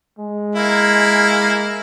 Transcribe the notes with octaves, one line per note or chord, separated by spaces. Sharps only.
G#3
A#3 E4